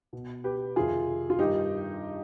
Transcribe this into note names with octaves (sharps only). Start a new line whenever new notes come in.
B2
G4 B4
F2 C3 D#3 F4 G#4
F4
G2 D#3 D#4 G4